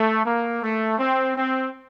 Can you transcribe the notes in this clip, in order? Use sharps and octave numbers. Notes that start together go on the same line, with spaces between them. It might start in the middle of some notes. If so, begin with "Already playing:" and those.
Already playing: A3
A#3
A3
C4
C4